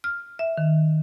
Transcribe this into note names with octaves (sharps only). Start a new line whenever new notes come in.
F6
E5
D#3